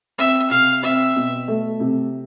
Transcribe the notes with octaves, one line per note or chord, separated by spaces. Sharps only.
C4 E5
C3 F5
C4 E5
B2
A3
C3